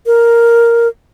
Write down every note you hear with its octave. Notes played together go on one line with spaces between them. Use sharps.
A#4